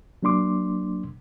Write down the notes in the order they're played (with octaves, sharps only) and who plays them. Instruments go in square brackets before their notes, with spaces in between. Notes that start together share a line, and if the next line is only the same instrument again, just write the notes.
[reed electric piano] F#3 A#3 D4 C6 D6